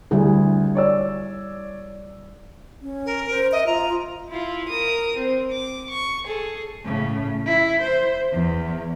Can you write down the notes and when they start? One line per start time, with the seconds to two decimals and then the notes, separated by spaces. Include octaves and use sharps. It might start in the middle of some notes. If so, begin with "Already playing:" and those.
0.11 D2 G3 E4 G#4
0.75 C#5 D5 E6
2.82 C#4
3.06 A#4
3.30 C5
3.52 D#5 E5
3.67 F4 A#5
4.28 E4 F4
4.68 A#4 D#6
5.17 C4
5.52 D6
5.90 C#6
6.25 G#4 A4
6.85 A2 C#3
7.46 E4
7.82 C5
8.33 E2